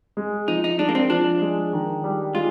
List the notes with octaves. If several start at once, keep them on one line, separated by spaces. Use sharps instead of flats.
G#3
F3 D#4
D#4
G#3 D4
A#3
C4
F3 D4
G#3
D#3
G3
G#3 F4